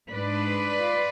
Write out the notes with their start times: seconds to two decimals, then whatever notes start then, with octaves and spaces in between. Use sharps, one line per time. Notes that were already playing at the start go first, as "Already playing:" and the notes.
0.12 G#2 G#3 D4 B4 D5
0.80 F4